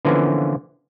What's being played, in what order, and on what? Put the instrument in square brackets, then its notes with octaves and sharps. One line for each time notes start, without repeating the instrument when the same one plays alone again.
[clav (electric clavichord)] D3 E3 F3 A#3 B3 C#4